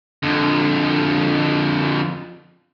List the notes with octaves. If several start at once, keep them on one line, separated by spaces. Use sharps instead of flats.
F2 D3